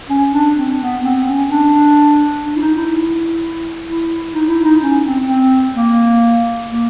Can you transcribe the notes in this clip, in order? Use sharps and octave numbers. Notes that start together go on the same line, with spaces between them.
C#4
D4
C4
B3
C4
C#4
D4
D4
E4
D#4
E4
E4
D#4
E4
D#4
C#4
C4
C4
A#3
A#3